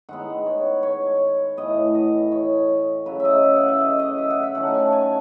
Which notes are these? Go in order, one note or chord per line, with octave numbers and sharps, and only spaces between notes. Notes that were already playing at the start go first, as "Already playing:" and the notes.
D#3 G#3 B3 F#5
C#5
C#5
A2 E3 B3 D#5
D#5
C#5
C#3 F#3 C#4 B4
E5
D#5
E5
F#5
E5
D#5
D#5
E5
F#5
E5
D#3 A3 C#4 F#5
F#5
G#5
A5
G#5